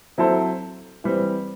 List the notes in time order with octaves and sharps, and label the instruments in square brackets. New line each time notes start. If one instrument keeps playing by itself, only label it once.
[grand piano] F#3 C4 E4 A4 C5
E3 G3 C4